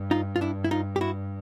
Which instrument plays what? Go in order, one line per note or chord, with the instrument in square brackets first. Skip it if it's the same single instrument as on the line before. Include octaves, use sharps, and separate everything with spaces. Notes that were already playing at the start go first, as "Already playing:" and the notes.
Already playing: [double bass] G2
[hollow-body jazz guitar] D#4 F4
F4
D4 E4
E4
D#4 F4
G4
E4 F#4